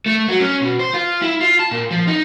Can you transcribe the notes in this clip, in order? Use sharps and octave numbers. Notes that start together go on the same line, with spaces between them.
A3
F#3
C#4
B2
C5
F4
E4
F4
A5
A#2
F3
D#4